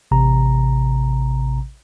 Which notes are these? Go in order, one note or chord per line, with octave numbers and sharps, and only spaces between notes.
A1 C3 A#5